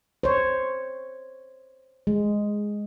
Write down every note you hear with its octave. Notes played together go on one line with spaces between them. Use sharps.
C5 C#5
G#3